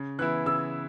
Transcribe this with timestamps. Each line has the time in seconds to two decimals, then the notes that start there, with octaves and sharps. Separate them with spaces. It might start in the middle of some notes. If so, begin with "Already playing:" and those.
Already playing: C#3
0.19 E3 B3 E4 F#6
0.46 C#3 E6